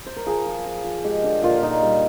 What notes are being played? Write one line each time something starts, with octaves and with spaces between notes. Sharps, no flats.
C5
A#4
F3 G#4
F3
F3
F3
G#3 G4
D3
A#2 F4
A#2 D#4
G3